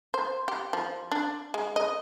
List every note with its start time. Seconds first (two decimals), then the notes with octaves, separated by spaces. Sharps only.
0.14 C5
0.48 G4
0.73 F3
1.12 D4
1.54 G#3
1.76 D#5